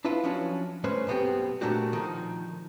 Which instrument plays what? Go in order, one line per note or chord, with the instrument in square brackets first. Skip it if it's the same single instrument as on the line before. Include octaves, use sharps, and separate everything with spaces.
[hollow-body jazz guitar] D4 E4 F4 B4 F5 F#5
F3 F#3 C#4 D4
G2 A3 C#4 B4 C5
B1 B2 B3 C4 G4
A#2 A3 A#3 D4 F#4 G4
D#3 F3